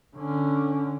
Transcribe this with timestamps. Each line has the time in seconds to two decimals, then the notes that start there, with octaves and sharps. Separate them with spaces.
0.17 D3 C#4